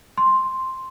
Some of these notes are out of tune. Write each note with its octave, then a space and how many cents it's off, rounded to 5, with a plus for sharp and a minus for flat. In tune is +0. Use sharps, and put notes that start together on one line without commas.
C6 +5